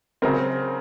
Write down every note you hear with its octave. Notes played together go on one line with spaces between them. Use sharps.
C#3 F#3 C4 A#4